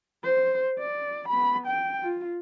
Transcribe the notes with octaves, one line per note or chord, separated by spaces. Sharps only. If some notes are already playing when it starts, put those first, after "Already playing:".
C5
D5
B3 B5
G5
F4